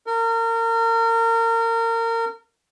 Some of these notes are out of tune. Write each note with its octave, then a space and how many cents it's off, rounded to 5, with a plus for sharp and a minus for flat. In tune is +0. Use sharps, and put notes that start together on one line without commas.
A#4 -30